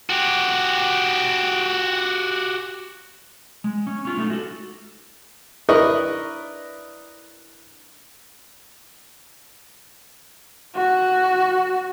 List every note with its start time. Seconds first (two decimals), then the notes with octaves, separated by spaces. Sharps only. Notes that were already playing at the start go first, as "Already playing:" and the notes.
0.10 F#4 G4
3.64 G#3
3.87 C#4
4.05 C#4 F4
4.17 G#3 A3 D#4
4.30 F#4 A4
5.69 D4 E4 A#4 B4 D#5 C#6
10.76 F#4